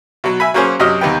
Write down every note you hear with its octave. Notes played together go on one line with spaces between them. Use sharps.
B2 F#3
E5 G#5 B5
F#3 A#3 C#4 G#4 C5
F#2 C3 F#3 D#5 F6
D#2 C3 B3 G5